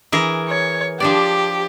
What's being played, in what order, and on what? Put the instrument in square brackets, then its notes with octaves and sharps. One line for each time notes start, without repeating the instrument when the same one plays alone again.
[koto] E3 G#4 A#4
[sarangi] C#5
[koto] F3 D4 D5 [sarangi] G4